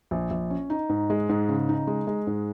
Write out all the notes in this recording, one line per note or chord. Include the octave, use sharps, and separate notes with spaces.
A#1
A#1
C#4
D#4
G#2
G#3
G#2
C#3
D#4
G#3
G#3
G#2